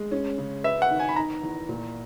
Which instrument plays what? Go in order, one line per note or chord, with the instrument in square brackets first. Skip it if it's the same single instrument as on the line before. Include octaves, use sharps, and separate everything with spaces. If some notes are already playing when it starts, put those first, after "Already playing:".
Already playing: [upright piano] G#3
C#4
C#3
[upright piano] B4 [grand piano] E5
[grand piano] F#5
[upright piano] D#3
[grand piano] G#5
B5
[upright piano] D#4 [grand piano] A#5
[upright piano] E2
A#2